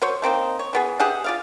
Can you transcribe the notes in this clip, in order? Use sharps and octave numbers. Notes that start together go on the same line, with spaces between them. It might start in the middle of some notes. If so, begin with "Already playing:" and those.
F#3 C5 C#5
A3 A#3 C4 D#4
C#5
E3 B3 G#4
G4 G#4 E5 F#5
F4 D5 F5